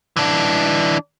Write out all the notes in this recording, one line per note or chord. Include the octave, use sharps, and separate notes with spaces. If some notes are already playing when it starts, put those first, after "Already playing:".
E3 D4